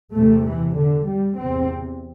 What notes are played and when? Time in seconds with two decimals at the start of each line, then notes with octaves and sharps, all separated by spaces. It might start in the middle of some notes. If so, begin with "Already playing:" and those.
0.12 E2 C3 A3
0.44 E3
0.76 D3
1.06 G3
1.37 E2 C3 C4